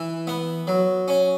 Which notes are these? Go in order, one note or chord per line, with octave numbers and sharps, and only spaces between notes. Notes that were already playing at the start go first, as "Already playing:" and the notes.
Already playing: E3
B3
F#3
C#4